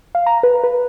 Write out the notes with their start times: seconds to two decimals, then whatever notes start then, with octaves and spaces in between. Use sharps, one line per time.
0.15 F5
0.26 A#5
0.43 B4
0.64 B4